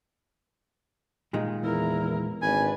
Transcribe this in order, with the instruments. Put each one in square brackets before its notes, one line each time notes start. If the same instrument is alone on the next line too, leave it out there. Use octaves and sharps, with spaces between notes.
[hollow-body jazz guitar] A#2 D#3 G#3
[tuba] E2 [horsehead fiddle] E4 A#4
[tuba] G#1 [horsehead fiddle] D4 B4 [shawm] G#5